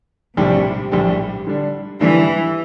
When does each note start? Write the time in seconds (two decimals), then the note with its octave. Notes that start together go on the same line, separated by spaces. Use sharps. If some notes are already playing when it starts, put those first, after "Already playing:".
0.37 A#1 A2 C3 G3 D4 G4
0.91 A#1 A2 G3 D4 G4
1.47 D3 G3 D4
2.01 D3 E3 G3 D4